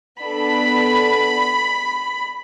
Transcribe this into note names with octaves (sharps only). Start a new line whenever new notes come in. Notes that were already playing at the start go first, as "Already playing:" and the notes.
B3 D4 A4 B5